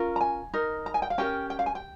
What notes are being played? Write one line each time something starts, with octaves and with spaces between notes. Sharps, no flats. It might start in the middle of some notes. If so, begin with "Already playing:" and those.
Already playing: C#4 F4 A#4
A#5
G#5
D#4 A#4
A#5
G#5
G5
F5
C#4 G4 A#4 G5
G5
F5
G#5
G5